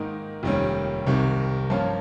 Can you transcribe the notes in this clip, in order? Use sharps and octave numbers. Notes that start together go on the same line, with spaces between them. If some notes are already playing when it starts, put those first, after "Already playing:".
Already playing: G#2 D#3 A#3 D#4
F1 D#2 D#3 G3 C#4
C2 C3 D#3
G2 F3 A#3 C#4 F4